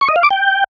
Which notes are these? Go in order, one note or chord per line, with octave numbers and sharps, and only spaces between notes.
C#6
D#5
F5
D6
G5